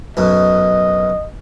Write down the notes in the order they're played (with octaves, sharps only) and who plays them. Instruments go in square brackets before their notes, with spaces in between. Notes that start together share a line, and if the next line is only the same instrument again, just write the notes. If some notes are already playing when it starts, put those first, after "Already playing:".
[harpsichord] B1 F#2 B2 [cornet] D#5